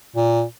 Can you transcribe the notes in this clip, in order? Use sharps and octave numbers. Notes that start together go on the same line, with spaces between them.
A#2